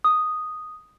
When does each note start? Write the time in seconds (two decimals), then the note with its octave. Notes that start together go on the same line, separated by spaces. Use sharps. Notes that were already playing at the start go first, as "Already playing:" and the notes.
0.04 D#6